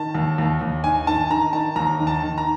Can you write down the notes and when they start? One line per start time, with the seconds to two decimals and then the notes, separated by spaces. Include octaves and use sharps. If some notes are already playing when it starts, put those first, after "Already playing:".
Already playing: D#3 A5
0.15 D#2
0.38 D#2
0.61 D#2
0.84 D#3 G#5
1.07 D#3 A5
1.30 D#3 A#5
1.53 D#3 A5
1.76 D#2 A#5
1.99 D#3
2.07 A5
2.22 D#3
2.38 A#5